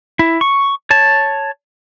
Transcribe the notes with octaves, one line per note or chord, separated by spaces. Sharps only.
E4
C#6
C#5 A5